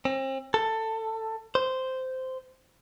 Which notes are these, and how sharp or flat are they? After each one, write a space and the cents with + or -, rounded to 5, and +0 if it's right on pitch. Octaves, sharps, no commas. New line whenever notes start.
C4 +40
A4 +15
C5 -10